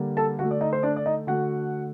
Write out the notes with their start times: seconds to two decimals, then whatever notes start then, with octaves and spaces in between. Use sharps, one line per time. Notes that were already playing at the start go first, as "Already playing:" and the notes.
Already playing: D3 G3 A#3
0.17 A4 A5
0.39 D3 F#4 F#5
0.43 A3
0.51 D5
0.61 D#4 D#5
0.73 C5
0.83 D4 D5
0.96 D5
1.06 D#4 D#5
1.27 D3 A3 F#4 F#5